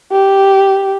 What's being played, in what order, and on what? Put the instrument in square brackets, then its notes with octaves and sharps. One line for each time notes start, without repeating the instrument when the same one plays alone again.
[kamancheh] G4